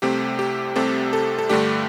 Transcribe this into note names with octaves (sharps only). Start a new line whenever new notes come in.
C2 C3 A3 C4 G4
G4
C2 C3 A3 C4 A4
A4
A4
G2 D3 A3 D4 G4